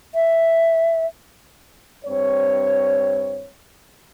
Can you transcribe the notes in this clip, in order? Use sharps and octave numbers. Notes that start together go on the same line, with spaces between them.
E5
G2 C4 C#5